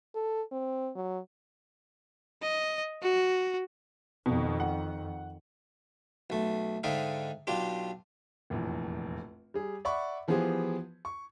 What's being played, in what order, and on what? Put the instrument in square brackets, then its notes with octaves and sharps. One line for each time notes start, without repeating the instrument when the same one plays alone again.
[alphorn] A4
C4
F#3
[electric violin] D#5
F#4
[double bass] F2 D#3 [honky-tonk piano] B2
[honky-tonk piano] F#5
[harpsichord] B1 A3
G#2 D3 D#4 E5 F5 G5
B1 D4 F4 G4
[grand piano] F1 A#1 E2
G3 G#4
D5 E5 F#5 B5 C#6
E3 F3 B3 G4 G#4 C5
C#6